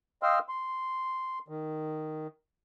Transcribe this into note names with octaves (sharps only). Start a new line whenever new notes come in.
D#5 F5 G5 C6 E6 F6
C6
D#3